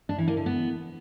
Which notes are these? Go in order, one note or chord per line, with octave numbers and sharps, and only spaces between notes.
D4
E3
A#3
D3
B3